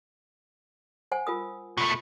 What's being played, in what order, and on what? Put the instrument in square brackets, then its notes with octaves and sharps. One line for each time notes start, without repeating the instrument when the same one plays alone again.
[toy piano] C5 F#5 G#5
F4 A#4 D#6
[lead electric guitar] B2 A3 [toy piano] F4